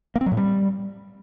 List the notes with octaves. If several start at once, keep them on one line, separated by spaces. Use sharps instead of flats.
A#3
C4
F#3
A2
G3